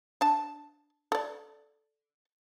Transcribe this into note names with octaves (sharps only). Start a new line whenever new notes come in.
D4 A5
A4 D5